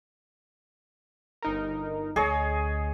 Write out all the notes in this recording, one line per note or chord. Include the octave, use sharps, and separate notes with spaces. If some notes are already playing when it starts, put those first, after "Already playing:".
G1 D#4 A#4
D2 G#4 C#5 D#5